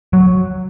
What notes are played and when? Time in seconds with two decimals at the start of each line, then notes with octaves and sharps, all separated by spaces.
0.13 F#3